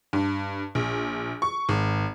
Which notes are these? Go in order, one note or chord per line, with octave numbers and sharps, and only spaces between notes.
G2
A#1
C#6
G#1